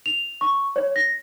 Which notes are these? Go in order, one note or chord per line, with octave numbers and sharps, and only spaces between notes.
F7
C#6
C#5
A#6